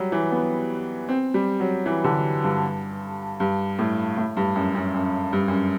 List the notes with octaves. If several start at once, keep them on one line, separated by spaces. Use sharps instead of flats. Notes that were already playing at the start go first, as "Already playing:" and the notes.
Already playing: F#3 G3
E3
B3
C4
G3
F#3
E3
D3
G2
G2
A2
A2
G2
F#2
F#2
F#2
G2
F#2